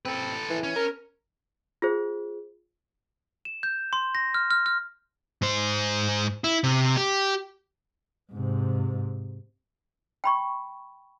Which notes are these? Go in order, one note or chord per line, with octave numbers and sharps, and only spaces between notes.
C4 A4 B4
E3
C#4
A#4
F4 G#4 C5
E7
G6
C6
A#6
F6
F6
F6
G#2 C5
E4
C3
G4
G#2 C3
G5 B5 C#6